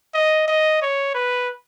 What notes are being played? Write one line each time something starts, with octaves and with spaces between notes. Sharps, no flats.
D#5
D#5
C#5
B4